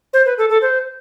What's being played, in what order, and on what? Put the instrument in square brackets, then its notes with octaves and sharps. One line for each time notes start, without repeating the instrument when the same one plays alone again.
[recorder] C5
B4
A4
A4
C5